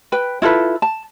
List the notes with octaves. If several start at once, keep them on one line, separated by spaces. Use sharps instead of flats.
B4 G5
E4 F4 A4 B4
A5